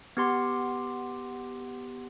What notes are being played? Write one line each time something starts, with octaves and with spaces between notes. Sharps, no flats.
B3 G4 C6